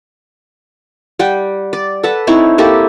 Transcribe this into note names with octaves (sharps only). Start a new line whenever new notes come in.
G3 F#5 G5
D5
A4 B4 F#5 A5
C4 D#4 E4 C#5
A#3 E4 G4 A4